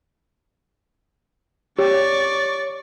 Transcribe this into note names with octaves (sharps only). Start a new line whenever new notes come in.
G4 C#5 D5 C#6